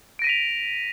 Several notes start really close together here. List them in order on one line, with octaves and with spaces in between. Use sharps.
D7 A#6 D#7 B6 F7